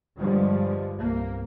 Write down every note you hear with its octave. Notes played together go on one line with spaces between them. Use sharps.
G2 D3 F3 G3 G#3
C2 A#3